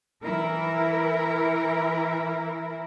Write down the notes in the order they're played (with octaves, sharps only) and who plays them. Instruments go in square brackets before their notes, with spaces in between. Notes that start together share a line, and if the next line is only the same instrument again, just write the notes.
[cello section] E3 E4 A#4